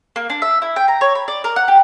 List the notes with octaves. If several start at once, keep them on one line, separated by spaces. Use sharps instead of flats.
A#3
D4
E5
E4
G5
A#5
C#5
B5
D5
A#4
F#5
G4